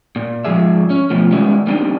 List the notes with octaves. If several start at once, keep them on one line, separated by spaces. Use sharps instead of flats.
A#2
G#2 F3 G#4 E5
C#4
B2 F3 A3
D#3 G3 G#3 B3 C#4 E4
G3 A#3 C4 D4 D#4